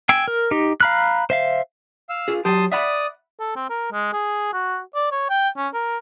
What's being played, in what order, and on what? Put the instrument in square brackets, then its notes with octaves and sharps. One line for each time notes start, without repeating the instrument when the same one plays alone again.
[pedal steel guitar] G5 G#5 E6
A#4
D#4 G4
F5 A#5 B5 F6 F#6
C5 E5 F5
[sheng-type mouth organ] F5 E6
[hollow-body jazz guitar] F4 G#4
[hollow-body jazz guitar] F#3 G4 [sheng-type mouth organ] A5 C6 D#6
[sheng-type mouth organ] D5 D#6 [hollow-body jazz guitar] E5 F#5 B5
[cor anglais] A4
C4
A#4
G#3
G#4
F#4
D5
C#5
G5
C#4
A#4